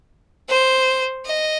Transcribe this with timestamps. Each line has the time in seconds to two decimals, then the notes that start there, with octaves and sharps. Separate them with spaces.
0.49 C5
1.26 D#5